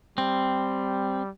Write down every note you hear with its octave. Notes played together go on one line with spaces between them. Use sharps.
G3 C4